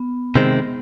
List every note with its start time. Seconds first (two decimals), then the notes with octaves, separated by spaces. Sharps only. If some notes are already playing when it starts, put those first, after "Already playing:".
Already playing: B3
0.35 C3 D#3 G#3 C4